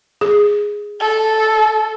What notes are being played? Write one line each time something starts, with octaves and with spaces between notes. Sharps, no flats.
G#4
A4